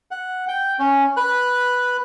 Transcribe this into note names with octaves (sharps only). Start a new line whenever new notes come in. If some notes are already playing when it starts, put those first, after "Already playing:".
F#5
G5
C#4
B4 F#6